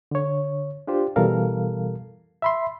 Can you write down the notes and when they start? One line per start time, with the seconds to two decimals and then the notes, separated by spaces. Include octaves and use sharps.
0.11 D3 C#5
0.87 D4 F4 G4 C5
1.16 B2 E3 G3 A4 A#4 F5
2.42 E5 B5 C6